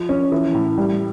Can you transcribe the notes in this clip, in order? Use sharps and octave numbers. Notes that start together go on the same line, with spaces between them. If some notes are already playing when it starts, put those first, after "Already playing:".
Already playing: F3
C#4
E3
A2
G3